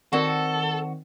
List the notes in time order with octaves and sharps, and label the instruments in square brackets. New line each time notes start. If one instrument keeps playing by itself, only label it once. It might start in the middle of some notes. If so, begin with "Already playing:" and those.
[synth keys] D#3 C4 [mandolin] F#4 [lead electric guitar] A4 [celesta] A#4 D5 F#5